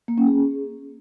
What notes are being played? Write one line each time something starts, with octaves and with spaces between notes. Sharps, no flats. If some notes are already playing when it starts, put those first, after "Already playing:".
A#3
C#4
G#4